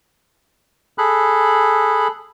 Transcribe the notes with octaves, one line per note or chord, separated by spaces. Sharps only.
G#4 A4 B5 F#6